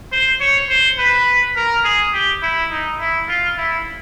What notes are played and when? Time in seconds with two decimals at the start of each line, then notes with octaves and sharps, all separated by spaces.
0.12 C5
0.41 C#5
0.69 C5
0.98 B4
1.56 A#4
1.85 G#4
2.13 G4
2.42 E4
2.71 D#4
3.00 E4
3.28 F4
3.58 E4